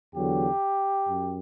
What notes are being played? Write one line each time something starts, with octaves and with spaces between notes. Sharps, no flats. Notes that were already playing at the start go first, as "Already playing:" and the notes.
E2 D3 F#3 G4
F#2